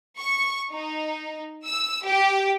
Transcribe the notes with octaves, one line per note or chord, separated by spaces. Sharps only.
C#6
D#4
E6
G4